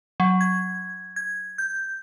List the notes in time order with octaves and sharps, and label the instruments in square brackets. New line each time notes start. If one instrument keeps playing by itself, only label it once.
[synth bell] F#3
G#6
G#6
G6